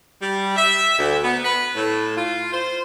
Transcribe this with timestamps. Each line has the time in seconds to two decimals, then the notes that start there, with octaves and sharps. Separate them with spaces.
0.22 G3
0.56 E5
0.99 D2
1.23 B3
1.44 B4
1.76 A2
2.17 F4
2.52 C5